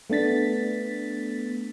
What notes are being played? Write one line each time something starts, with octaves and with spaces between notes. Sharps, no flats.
A3 B3 D4 A6 B6